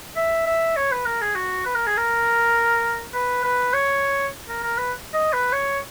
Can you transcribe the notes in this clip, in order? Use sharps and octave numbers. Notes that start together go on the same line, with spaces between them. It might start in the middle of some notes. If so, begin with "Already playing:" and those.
E5
E5
C#5
B4
A#4
G#4
F#4
B4
A#4
G#4
A#4
B4
B4
C#5
A#4
A#4
B4
D#5
B4
C#5